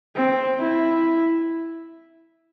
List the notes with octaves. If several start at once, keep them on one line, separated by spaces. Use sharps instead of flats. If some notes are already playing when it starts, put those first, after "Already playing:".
C4
E4